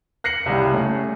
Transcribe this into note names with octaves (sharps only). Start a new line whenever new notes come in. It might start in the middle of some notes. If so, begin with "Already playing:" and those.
F#6 A#6 C7 C#7 F#7
C2 C#3 G3
A3 C#4